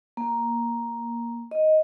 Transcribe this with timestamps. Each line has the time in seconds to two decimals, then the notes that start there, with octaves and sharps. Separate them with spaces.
0.17 A#3
1.51 D#5